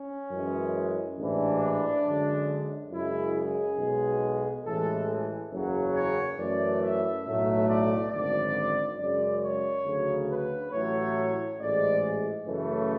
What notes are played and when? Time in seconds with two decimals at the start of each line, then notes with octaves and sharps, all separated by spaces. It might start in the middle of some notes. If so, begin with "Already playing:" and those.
Already playing: C#4
0.30 F#2 E3 G#3
1.17 A1 G#2 E3 D4
2.05 F#2 D3 G#3
2.90 F#2 C#3 G#3 E4
3.35 G#4
3.78 B1 B2 G#3
4.64 A1 A2 E3 G#3 A4
5.51 F#1 E2 C#3 F#3
5.95 C#5
6.38 F#2 E3 A3 D5
6.81 E5
7.25 B1 A2 F#3 A3 E5
7.68 D5
8.11 G#1 F#2 D3 D5
8.98 F#2 C#3 G#3 D5
9.41 C#5
9.85 D2 C#3 F#3
10.28 B4
10.71 A1 A2 F#3 A3 C#5
11.59 A1 G#2 G#3 D5
12.45 F#2 C#3 E3 A3